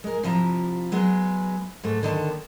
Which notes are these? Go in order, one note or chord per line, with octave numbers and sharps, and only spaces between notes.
G#3 A#4
C3 F3 E4 A#5
F#3 G#3 B3
G#2 A3
D#2 D3 D#3 A5